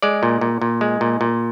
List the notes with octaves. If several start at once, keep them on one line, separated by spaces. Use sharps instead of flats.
G#3 D5
A#2
A#2
A#2
G#3
A#2
A#2